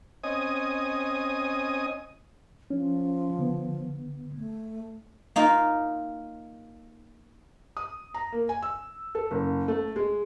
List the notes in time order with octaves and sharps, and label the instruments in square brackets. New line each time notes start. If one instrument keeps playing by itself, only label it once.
[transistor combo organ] C4 C#4 D#5 G#5 D#6
[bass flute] F3 [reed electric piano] C#4
[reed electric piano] D3 B3
[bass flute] A3
[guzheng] A#3 D#4 F4
[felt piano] D#6
A#5
A#3
G#5
E6
A4
F#1
A3
G#3